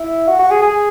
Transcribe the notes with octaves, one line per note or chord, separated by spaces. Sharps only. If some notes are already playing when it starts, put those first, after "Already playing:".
Already playing: E4
F#4
F#4
G#4
G#4